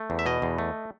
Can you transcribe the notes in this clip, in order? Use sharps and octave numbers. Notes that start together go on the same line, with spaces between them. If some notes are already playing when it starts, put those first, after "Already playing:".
Already playing: A3
E2
E5
B2 D#5
E2
A3